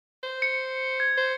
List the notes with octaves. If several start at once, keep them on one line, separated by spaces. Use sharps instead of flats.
C5
C#7
G#6
C5